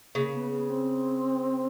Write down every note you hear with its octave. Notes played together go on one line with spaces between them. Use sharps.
C#3 A#3
B3
B3
C4